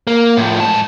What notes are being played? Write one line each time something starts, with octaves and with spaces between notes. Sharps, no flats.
A#3
A2 F3
G#2 A5